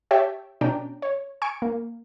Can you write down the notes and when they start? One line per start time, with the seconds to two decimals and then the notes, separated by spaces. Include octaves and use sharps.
0.11 G4 C#5 E5 G5 A5
0.61 B2 C#4 D4 G5 A#5
1.02 C#5
1.42 G#5 C#6 D7
1.62 A#3